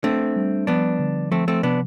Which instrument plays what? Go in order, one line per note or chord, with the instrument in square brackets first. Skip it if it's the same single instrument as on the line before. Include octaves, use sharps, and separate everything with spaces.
[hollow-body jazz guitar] A3 C4 [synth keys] D4
[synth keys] G3
[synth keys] F3 [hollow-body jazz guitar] B3 D4
[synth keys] D3
[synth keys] F3 [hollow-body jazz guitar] A3 C4
[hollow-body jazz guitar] A3 C4
[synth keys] C3 [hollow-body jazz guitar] B3 D4